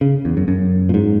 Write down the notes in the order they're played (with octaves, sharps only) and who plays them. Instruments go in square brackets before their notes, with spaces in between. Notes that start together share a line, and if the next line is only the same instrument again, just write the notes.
[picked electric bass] C#3
E2
F#2
F#2
A#2
G#2